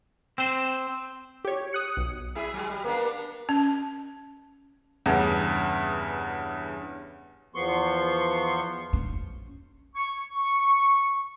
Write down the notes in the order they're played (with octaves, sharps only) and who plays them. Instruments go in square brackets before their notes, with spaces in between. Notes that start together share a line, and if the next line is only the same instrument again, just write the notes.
[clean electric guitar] C4 C5
[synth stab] G4 C#5
D#6 F#6 C#7
B1
[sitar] F#3 E4 G#4
F#3 G#3
G3
A#3 B3 D4
[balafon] C#4
[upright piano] E2 G2 C#3
[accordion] E2 F3 B3 C6 C#6
[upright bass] C#4
[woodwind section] C#6